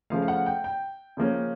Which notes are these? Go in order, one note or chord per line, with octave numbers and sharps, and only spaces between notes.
C#3 F3 A3 F5
F5
F#5
G5
G5
C#3 F3 A#3 C#4